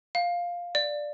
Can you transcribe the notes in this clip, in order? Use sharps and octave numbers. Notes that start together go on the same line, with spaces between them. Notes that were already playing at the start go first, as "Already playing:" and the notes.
F5
D5